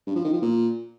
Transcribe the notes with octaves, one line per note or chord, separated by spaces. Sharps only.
G2
F3
D#3
F3
A#2